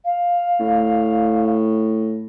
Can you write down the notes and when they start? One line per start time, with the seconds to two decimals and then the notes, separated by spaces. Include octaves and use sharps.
0.05 F5
0.60 A2